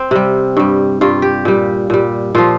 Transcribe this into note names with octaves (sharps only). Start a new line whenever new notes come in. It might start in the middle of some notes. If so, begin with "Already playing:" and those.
Already playing: C4
C3 G3
G2 G3
G2 G3 F4
G4
A#2 G3
A#2 G3
A#2 F3 F4